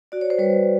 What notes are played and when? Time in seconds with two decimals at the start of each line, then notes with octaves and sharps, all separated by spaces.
0.12 F#4 D5
0.21 C#5
0.30 C5
0.38 G3 B4 C#5